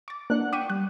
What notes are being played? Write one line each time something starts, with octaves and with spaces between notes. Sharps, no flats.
C#6 D6 A6
A#3 D4 F#5 F#6
G5 C#6 D6 B6 D#7
G3 F#6